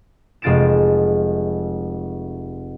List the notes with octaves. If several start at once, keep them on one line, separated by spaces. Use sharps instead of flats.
F1 G#3 F4 A6 D7 E7